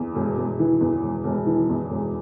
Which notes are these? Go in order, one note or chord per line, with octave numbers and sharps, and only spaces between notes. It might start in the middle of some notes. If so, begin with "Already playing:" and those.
Already playing: E2
E1
E1
E3
E2
E1
E1
E3
E2
E1